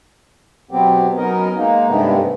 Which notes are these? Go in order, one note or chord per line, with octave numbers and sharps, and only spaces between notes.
B2 F#3 B3 C4 G4
F#3 B3 C#4 D#4 A#4 D#5
G#3 A#3 D#4
G2 C3 D#3 G#3 A3 B3